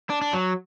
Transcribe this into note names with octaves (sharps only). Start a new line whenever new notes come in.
D4
D4
F#3